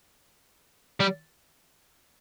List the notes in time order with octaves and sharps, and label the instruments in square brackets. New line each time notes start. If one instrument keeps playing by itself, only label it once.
[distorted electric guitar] G3